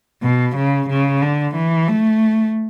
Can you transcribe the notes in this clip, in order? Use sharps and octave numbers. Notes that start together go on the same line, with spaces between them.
B2
C#3
C#3
D3
E3
A3